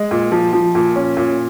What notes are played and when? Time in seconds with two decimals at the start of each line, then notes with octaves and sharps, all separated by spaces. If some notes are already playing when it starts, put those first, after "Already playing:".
Already playing: G#3
0.11 A#2
0.32 F3
0.53 F3
0.75 A#2
0.96 C#4
1.17 A#2